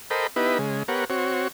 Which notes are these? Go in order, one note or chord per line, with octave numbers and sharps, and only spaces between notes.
A4 A#4 C5 D#5 G5 B5
B3 D#4 E4 G4 B4
C#3 G#3
B3 G4 A#4 C#5 F#5
C4 F#4 C#5